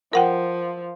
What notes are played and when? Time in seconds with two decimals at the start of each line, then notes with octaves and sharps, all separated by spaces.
0.13 F3 A#4 F#5 G5